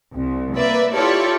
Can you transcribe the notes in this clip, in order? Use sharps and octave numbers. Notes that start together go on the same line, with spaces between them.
C2
A#3 B4 D5 E5
E4 F4 G4 A4 C#5 D5